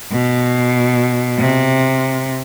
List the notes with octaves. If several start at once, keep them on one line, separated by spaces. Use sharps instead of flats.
B2
C3